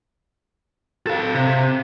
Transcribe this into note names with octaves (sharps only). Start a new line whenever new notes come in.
A4 F5
C3